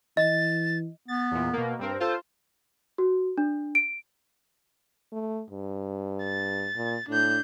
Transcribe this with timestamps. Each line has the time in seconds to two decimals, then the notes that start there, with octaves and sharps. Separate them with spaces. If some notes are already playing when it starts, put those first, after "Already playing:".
0.17 E3 D#5 A6
1.08 B3 A6
1.31 E2 A#2
1.53 B2 A#3
1.79 G2 C4 A#4
2.00 F4 A4 C5 A5
2.98 F#4
3.38 D4
3.75 D7
5.12 A3
5.50 G2
6.24 A6
6.76 A#2
7.09 A2 D4 G6